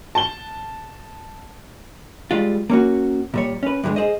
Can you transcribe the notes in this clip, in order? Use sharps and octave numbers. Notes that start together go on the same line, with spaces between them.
A5 G7
G3 G#3 F4
A#3 C#4 F#4
A#2 G3 C#5
C#4 B4
G2 D3 F#3 G#3
G#4 C5 D#5